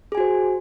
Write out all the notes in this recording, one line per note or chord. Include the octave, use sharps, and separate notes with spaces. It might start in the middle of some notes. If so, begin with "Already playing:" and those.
F#4 G#4 C5 G#5